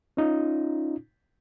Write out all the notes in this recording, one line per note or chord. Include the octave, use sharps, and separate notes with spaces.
C#4 D#4 F4